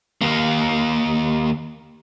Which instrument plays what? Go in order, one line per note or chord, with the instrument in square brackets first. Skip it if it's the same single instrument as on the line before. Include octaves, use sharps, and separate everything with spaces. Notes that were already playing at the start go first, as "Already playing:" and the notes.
[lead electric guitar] D#2 A#3